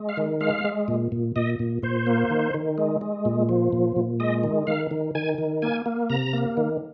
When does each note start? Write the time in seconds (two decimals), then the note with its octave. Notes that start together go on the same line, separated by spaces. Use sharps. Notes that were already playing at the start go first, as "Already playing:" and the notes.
Already playing: G#3
0.09 F5
0.17 D#3
0.41 G#3 F5
0.64 G#3
0.88 A#2
1.12 A#2
1.36 A#2 D#5
1.59 A#2
1.83 A#2 C5
2.07 A#3
2.30 D#3
2.54 D#3
2.78 G#3
3.01 G#3
3.25 A#2
3.49 F3
3.73 A#2
3.96 A#2
4.20 G#3 D#5
4.44 D#3
4.67 D#3 F5
4.91 D#3
5.15 D#3 G#5
5.38 D#3
5.62 A#3 G#5
5.86 A#3
6.10 C3 A#5
6.33 A#3
6.57 D#3